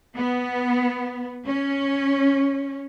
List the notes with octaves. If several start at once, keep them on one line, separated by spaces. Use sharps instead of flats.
B3
C#4